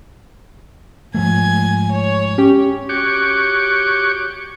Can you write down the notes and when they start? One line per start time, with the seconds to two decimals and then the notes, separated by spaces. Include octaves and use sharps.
1.14 G#2 F3 A3 G#5 G#6
1.90 C#5
2.38 C#4 G4 G5
2.89 F#4 G4 C#5 C#6 D6